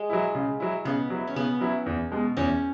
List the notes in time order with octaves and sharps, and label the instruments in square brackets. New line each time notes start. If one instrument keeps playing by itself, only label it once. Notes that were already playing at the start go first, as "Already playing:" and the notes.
Already playing: [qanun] G#3
[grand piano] F#3 E4
C#3
F#3 E4
[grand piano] C#3 [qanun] B3
[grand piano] F#3 E4
[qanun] C#4
[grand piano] C#3 [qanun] B3
[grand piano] F#3 E4
E2
B2 G#3
[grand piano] E2 [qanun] C#4